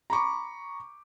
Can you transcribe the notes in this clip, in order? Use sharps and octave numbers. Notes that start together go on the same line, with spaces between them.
A#5 B5 C#6 D6